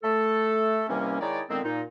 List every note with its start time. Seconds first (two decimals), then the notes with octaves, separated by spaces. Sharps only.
0.03 A3 A4
0.89 C3 D#3 E3 G3 A#3 C#4
1.21 D#3 G#3 D#4 E4 C#5 D5
1.49 A#2 D3 D#3 G#3 B3 C4
1.64 A#2 D#4